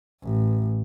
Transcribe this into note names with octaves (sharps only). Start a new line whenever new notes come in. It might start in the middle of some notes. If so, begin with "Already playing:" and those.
A1